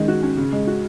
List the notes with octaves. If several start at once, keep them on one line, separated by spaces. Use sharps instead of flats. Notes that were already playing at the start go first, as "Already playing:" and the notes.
Already playing: D#3 G#3 C#4
F#4
C#4
C#3
G#3
F#4